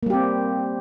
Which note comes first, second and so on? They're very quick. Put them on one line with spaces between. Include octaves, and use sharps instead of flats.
A#3 G3 G4 C4